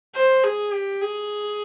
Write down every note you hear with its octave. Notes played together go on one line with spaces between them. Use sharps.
C5
G#4
G4
G#4